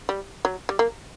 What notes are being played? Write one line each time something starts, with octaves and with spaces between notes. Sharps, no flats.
G3
F#3
G3
A#3